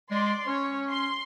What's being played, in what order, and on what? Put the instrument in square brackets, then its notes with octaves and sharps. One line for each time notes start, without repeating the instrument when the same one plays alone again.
[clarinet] G#3 [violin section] D5 C6
[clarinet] C#4 [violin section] C#5
[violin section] C6